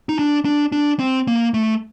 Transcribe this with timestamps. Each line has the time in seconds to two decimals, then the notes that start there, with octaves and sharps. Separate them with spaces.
0.09 D#4
0.19 D4
0.45 D4
0.72 D4
0.99 C4
1.28 A#3
1.54 A3